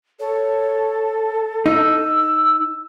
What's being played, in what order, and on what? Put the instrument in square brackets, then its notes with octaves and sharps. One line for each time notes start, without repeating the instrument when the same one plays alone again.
[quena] A4 [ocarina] C#5
[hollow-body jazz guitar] D#4 [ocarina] E6